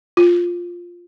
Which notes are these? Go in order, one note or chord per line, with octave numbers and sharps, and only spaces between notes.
F4